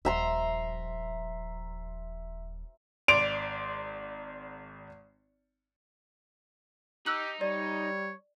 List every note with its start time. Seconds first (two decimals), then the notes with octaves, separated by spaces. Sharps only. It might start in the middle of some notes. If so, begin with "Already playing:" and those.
0.05 D#1 F3 E5 A#5 C6
3.08 G#1 D5 C6 D7 F7
7.06 D#4 G4 E6 F#6 F#7
7.41 G3 C#5 D5